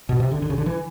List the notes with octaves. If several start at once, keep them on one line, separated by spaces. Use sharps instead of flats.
B2
C3
D3
D3
C#3
D3
E3